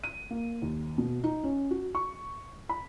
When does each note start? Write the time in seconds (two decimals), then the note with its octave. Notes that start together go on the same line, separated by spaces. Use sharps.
0.04 D#7
0.31 A#3
0.62 D#2
0.98 B2
1.24 D#4
1.43 C#4
1.71 F#4
1.95 C#6
2.69 B5